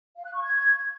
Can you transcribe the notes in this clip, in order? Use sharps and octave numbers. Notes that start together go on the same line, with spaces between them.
F5
F#6
C#6
G#6